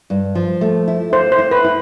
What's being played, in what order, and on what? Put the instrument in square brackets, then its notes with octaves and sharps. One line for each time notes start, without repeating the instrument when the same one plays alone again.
[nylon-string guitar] G2
F3
A3
E4
[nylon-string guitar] E4 [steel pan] C5
[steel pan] C5
[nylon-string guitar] E4
[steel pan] B4
[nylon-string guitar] E4